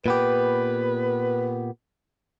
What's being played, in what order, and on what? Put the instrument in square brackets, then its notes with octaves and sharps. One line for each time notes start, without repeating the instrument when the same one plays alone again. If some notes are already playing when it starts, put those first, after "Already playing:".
[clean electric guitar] A#2 B3 G4 [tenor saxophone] B4